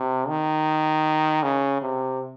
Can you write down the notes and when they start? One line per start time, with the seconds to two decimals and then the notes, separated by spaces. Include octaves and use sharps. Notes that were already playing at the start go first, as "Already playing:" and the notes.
Already playing: C3
0.28 D#3
1.43 C#3
1.81 C3